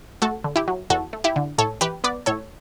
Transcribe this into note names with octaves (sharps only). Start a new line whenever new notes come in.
A3 F#4 A4
D3
E4 G4
F#3
E2 F#4 A4
A3
E4 G4
D3
A2 A4 C#5
E3 G4 B4
B3 B4 D5
A2 A4 C#5